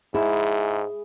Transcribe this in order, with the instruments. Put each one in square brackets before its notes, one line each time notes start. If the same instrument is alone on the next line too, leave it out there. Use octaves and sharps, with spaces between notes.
[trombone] G#2 [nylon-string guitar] E4 [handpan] G#4